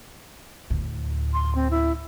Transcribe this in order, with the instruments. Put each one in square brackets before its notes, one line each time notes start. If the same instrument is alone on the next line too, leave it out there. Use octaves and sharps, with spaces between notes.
[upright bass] D2 A2
[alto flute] C6
C4
E4